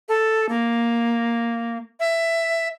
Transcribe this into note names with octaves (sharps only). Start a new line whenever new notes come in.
A4
A#3
E5